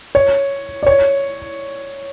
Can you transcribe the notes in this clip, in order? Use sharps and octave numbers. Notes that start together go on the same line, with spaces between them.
C#5
D5
C#5